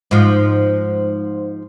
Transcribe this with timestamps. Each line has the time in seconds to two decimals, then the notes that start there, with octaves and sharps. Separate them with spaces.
0.11 G#2 F3